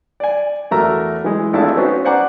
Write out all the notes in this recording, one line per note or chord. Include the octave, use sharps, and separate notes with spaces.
D5 G#5
E2 A3 F#4 A#4 A#5 E6
E3 G#3
G#1 A3 D4 E4 F4 A5
B3 C#4 D#4 F#4 C5
C5 D5 F#5 G#5 A#5 D6